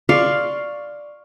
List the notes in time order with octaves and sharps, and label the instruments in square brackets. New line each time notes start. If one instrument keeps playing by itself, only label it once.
[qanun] D5 F5 C6 C#6